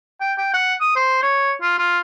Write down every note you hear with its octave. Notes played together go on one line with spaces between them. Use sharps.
G5
G5
F#5
D#6
C5
C#5
F4
F4